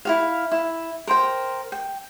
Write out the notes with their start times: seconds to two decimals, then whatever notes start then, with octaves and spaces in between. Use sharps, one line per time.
0.05 E4 F#4 F5
0.52 E4
1.07 A#4 C5 G5
1.72 G5